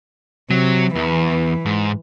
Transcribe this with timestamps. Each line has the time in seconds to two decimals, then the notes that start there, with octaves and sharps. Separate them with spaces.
0.51 C3 F#3
0.96 E2 E3
1.66 G#2